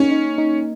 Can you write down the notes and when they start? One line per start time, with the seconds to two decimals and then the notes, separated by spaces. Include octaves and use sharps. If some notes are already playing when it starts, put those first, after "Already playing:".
Already playing: A#3 C#4 D#4
0.11 D#4
0.38 D#4